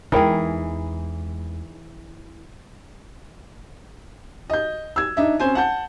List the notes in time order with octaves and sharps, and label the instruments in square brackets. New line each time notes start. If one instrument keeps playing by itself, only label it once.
[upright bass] E2 G#3 [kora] E3 G#4 [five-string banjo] D#4 A#4 G5
[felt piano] D#5 G6
E6 G#6
D4 D#4 E5
C4 C#4 C5 G#5
F#5 A5 G6